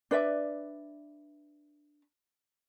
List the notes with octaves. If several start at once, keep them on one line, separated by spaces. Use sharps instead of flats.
D4 B4 D5 E5